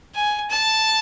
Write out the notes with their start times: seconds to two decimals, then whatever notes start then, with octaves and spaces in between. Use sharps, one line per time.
0.15 G#5
0.50 A5